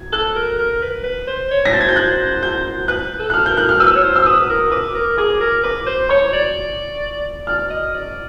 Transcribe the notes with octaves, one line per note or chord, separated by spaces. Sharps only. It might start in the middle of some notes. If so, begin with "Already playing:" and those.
Already playing: G#6
A4 F#6
A#4
A#4
B4
B4
C5
C#5
A#6
C5 A6
G#6
G6
F#6
G6
B4 F#6
A4
F#6
F6
A#4 G6
F#6
F6
B4 E6
C#5
C5
E6
B4 D#6
B4
A#4
B4 D6
A#4
G#4 D6
A#4
B4 D6
C5
C#5 C#6
D5
D5 F6
D#5
D5